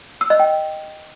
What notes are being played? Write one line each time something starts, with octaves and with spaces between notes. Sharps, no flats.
E6
D#5
G5